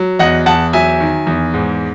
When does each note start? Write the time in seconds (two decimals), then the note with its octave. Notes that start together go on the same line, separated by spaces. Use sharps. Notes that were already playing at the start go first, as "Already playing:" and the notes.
Already playing: F#3
0.19 E2 D#5 F#5
0.46 E2 F#5 A5
0.73 F#3 E5 G#5
1.00 D#3
1.27 E2
1.54 G#2